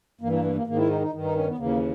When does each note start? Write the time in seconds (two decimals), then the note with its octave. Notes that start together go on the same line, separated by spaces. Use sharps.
0.21 G2 A#3
0.24 E3
0.32 A#3
0.44 A#3
0.55 A#3
0.67 G#2 D#3 A#3
0.78 E4
0.89 D#4
1.01 D#4
1.12 G2 D#3
1.24 D#4
1.36 C#4
1.46 B3
1.58 D#2 C#3 E3 A#3